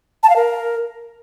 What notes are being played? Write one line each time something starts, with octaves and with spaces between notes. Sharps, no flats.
A5
F5
A#4